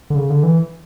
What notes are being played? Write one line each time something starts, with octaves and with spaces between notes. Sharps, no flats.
D3
C#3
D3
E3